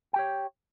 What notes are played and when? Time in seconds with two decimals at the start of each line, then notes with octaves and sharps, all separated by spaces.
0.13 G5
0.16 G4
0.19 C#5